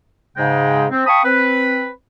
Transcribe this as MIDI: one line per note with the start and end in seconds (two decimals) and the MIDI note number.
0.37 0.86 44
0.37 0.86 49
0.37 0.86 56
0.37 0.86 79
0.91 1.06 60
1.07 1.21 77
1.07 1.21 79
1.07 1.21 81
1.07 1.21 83
1.07 1.21 85
1.07 1.21 87
1.24 1.88 60
1.24 1.88 71